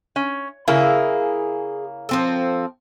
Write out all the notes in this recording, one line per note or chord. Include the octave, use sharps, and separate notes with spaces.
C#4
C#3 A#3 E4 G#4
F3 C4 A4